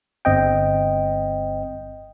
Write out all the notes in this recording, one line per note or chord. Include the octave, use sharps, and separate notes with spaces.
G1 C4 D#5 G5